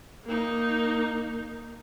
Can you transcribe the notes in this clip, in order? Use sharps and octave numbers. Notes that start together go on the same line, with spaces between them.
A#3 D#4